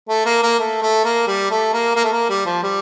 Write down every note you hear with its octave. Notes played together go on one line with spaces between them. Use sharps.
A3
A#3
A#3
A3
A3
A#3
G3
A3
A#3
A#3
A3
A#3
G3
F3
G3